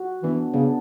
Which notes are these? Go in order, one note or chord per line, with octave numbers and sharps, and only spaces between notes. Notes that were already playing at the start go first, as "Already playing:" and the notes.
Already playing: F#4
E3 B3 D4
C#3 B3 D4